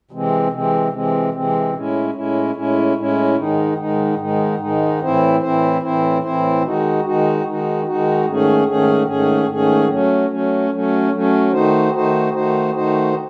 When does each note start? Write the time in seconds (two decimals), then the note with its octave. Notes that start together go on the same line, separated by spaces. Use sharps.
0.11 C3 E3 G#3 C4
0.51 C3 E3 G#3 C4
0.92 C3 E3 G#3 C4
1.33 C3 E3 G#3 C4
1.73 A2 G#3 C#4 E4
2.14 A2 G#3 C#4 E4
2.54 A2 G#3 C#4 E4
2.96 A2 G#3 C#4 E4
3.36 G#2 D#3 G#3 D#4
3.77 G#2 D#3 G#3 D#4
4.18 G#2 D#3 G#3 D#4
4.59 G#2 D#3 G#3 D#4
5.00 A2 E3 C4 E4 C5
5.40 A2 E3 C4 E4 C5
5.81 A2 E3 C4 E4 C5
6.22 A2 E3 C4 E4 C5
6.62 D#3 G#3 D#4 F#4
7.03 D#3 G#3 D#4 F#4
7.44 D#3 G#3 D#4 F#4
7.85 D#3 G#3 D#4 F#4
8.26 G#2 D#3 A3 C#4 G#4
8.66 G#2 D#3 A3 C#4 G#4
9.07 G#2 D#3 A3 C#4 G#4
9.49 G#2 D#3 A3 C#4 G#4
9.89 F#3 A3 C#4
10.29 F#3 A3 C#4
10.70 F#3 A3 C#4
11.12 F#3 A3 C#4
11.52 D#3 A3 D#4 F#4 C5
11.93 D#3 A3 D#4 F#4 C5
12.33 D#3 A3 D#4 F#4 C5
12.74 D#3 A3 D#4 F#4 C5